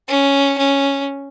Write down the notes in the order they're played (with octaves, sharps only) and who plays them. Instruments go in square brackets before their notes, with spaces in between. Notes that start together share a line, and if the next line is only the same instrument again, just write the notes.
[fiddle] C#4
C#4